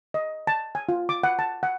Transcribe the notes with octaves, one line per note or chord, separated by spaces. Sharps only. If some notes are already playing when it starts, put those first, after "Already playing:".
D#5
A5
G#5
F4
D6
F#5
A5
F#5